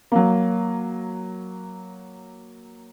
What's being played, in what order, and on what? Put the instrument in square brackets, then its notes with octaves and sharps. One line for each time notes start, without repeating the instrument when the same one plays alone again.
[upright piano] F#3 A#3